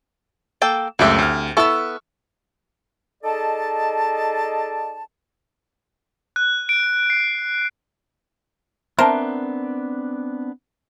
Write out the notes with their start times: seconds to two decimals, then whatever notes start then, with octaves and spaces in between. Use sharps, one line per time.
0.62 A#3 A4 G5
0.99 C#2 F#2 A3 C4 G4 E5
1.19 D2 F6
1.57 B3 E4 A4 C#6 E6
3.24 D#4 G#4 A4 D5 D#5 A5
6.36 F#6
6.69 D7
7.10 C7
8.99 B3 C4 D4 A#4 C5 E5 A5